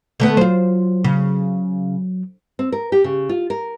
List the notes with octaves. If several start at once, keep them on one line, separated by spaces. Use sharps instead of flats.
D3 A3 B3
F#3 F4 C5
C#3
C4
A#4
G4
C#3
F4
A#4